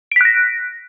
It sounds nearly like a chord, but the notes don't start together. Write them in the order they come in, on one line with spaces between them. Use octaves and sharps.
D7 B6 F#6 A#6